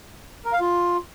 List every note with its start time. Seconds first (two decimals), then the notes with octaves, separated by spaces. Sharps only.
0.45 A#4
0.53 F5
0.61 F4